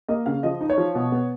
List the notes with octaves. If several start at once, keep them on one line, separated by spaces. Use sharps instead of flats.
A#3 D#5
C#3 F5
F3 D#5
D#4
C#5
F3
B2
B3